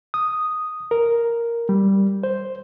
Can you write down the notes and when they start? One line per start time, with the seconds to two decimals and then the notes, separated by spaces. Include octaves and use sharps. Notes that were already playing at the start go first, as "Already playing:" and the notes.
0.14 D#6
0.91 A#4
1.69 G3
2.23 C5